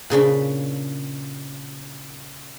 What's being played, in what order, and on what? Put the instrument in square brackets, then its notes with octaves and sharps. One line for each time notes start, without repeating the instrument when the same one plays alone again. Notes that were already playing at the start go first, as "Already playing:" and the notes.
[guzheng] A#2 C#3 D4 B5